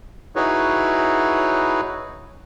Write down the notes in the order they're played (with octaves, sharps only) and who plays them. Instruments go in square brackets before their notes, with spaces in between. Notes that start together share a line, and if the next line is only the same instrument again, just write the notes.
[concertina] D#4 E4 F#4 G#4 B4 C#5